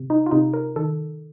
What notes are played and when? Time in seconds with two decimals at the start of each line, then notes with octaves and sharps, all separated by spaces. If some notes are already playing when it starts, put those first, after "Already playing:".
Already playing: C3
0.10 D#4
0.26 F4
0.31 C3 D#4
0.54 A#4
0.76 D#3 A4